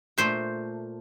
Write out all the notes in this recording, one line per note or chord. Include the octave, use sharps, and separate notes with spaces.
A#2 A3 C5